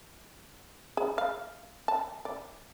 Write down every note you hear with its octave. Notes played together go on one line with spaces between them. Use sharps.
G#4
F5
A5
D5